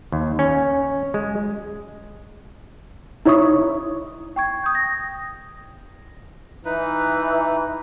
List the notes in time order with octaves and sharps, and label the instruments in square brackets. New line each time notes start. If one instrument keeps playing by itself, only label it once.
[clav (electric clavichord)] D#2
C#4
G#3
[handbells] D#4 E4 C#5 E5 C#6 D#6
[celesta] G5 C#6 G#6
D#6 G6
A#6
[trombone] E3 [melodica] D#4 B4